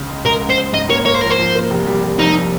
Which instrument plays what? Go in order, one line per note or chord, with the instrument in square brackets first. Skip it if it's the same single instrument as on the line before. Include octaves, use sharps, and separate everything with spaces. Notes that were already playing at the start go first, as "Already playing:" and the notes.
Already playing: [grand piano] C#2 C#3
G#3
[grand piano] G#3 [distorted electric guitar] A#4
[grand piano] C#2
[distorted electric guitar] C5
[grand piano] C#2
[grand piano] G#2 [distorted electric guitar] D#5
[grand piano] A#3 [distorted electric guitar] C#5
[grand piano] A#3 [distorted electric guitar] C#5
[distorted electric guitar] C5
[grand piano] F3 [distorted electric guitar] A#4
[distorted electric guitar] C5
[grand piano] F3
A#3
F1
G3
F1
[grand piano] F2 [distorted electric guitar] D#4